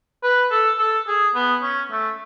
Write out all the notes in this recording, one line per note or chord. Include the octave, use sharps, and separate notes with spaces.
B4
A4
A4
G#4
B3
C#4
A3